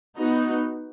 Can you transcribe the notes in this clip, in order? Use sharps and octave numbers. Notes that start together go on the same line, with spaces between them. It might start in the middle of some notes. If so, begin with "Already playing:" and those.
B3 D#4 F#4